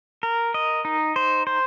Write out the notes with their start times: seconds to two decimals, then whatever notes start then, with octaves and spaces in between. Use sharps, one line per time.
0.23 A#4
0.54 D#5
0.85 D#4
1.16 C5
1.47 C5